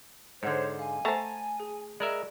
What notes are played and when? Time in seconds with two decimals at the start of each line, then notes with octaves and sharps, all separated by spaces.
0.43 G#2 D3 C5 C#5 D#5 F#5 G#6
0.79 F5 G#5
1.05 A3 C5 F#5 A5 A#5
1.60 G#4
2.00 G#3 A#4 D5 E5 B5